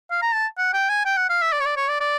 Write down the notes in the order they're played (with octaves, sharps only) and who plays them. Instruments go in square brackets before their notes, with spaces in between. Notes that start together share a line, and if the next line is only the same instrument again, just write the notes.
[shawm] F5
A#5
A5
F#5
G5
G#5
G5
F#5
F5
E5
D5
C#5
D5
C#5
D5
D5